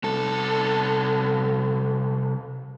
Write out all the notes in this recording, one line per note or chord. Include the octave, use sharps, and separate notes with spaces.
C2 A4